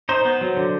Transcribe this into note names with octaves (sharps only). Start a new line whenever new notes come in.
D#4 C5
B3
F#3
D3